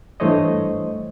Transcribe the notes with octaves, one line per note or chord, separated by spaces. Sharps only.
G2 E3 A3 C5 C#5 D#5